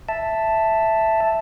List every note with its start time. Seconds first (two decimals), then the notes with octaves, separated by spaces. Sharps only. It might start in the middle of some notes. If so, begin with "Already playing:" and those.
0.09 E5 A5